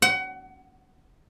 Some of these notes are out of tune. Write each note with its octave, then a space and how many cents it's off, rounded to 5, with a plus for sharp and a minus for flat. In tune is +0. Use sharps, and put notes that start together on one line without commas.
F#5 +30